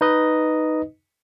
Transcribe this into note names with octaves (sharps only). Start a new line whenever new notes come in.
D#4 B4 D#5